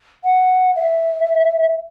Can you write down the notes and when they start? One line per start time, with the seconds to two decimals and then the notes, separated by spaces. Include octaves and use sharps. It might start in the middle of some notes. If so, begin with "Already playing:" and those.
0.24 F#5
0.76 E5